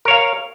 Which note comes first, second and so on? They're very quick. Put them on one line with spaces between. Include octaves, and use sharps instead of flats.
A#4 C#5 F5